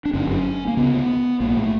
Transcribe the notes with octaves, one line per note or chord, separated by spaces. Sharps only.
D4
G1 F#2 D3 C#4
C#4
A#3
D2 C#3 B3
A#1 G#2 A#3
A3